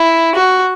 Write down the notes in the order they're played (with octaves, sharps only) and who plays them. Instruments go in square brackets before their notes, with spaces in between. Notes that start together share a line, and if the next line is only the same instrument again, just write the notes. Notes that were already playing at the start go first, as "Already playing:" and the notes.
Already playing: [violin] E4
F#4